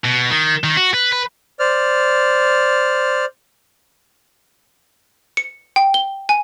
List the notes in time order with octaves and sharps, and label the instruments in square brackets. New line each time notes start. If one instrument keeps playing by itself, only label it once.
[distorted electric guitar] B2
D#3
D#3
F#4
B4
B4
[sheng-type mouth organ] C5 D5 F6
[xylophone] C#7
G5
G7
G#5